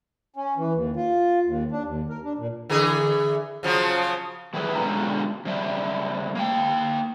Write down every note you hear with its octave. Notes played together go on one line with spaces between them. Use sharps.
C#4
E3
D#2
F4
D#2
D4
D#2
A#4
D4
A#2
D3 E3 G#4
C#3 F3 F#3
E3 G3 E4 G4 G#4 B4
B2 D3 G#3 C#4 F4 A#5
C#3 G3 E5
A#3 F5 G5